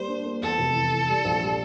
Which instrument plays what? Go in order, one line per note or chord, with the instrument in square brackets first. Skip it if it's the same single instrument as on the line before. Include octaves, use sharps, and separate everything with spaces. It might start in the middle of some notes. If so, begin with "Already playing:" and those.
Already playing: [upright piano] G3 A#3 [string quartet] C5
[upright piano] D4
A#3
[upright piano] E2 [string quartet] A4
[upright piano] F1
E3
E3
G3
A#1
G3